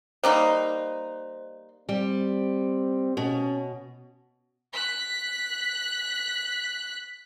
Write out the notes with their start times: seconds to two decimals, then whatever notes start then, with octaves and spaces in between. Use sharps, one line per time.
0.24 G3 A#3 D#4 C5
1.89 G3 C4
3.17 B2 C#4
4.73 F#6 B6